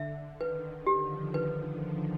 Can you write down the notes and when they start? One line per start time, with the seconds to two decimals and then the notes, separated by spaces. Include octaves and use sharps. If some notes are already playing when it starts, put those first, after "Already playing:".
Already playing: D3 E5
0.40 D#3 B4
0.72 D#3
0.87 G4
1.03 F3
1.34 B4